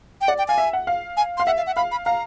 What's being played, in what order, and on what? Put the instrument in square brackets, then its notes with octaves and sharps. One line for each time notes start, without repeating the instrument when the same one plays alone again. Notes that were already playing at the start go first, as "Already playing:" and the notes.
[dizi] G5
[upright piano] D5 [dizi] F#5
[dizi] G5
[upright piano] F5 [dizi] G#5
[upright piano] E5
F#5
F5
[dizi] G#5
[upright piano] F5 [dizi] C6
[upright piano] E5 [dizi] F#5
[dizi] F5
F#5
[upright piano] F5 [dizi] B5
[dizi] B5
[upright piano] F5 [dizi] A#5